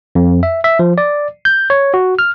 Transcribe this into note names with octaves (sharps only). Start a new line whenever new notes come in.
F2
E5
E5
F3
D5
G6
C#5
F#4
F6